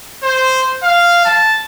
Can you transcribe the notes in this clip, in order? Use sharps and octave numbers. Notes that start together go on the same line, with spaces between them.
C5
F5
A5